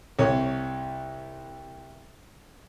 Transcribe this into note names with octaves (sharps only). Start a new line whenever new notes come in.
C2 C#5